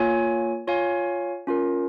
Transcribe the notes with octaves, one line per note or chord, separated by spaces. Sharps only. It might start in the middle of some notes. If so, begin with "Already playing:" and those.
Already playing: A#3 F4 C#5 G#5
F4 C#5 F5 G#5
C#4 F4 A#4